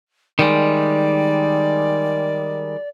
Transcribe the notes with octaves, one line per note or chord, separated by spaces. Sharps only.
D#3 G3 G#3 D5